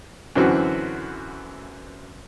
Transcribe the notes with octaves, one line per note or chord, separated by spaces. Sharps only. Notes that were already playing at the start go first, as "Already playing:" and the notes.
F#2 D3 E3 C4 F#4